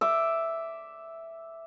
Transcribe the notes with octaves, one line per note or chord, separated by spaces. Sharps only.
E5 D6